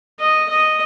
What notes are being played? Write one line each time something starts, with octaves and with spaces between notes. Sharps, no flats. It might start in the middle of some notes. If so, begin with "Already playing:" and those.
D#5
D#5